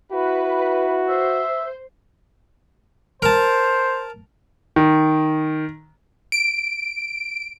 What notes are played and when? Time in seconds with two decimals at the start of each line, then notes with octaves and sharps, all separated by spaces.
0.12 E4 F#4 B4
1.08 C5 E5
3.22 A#4 C5 A5
4.76 D#3
6.32 D7